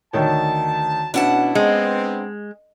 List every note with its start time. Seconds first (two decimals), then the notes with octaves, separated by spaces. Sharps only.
0.13 D2 D#3 C#5 A5
1.14 B2 C#4 D4 E4 F#5 A5
1.55 G#3 B3 C4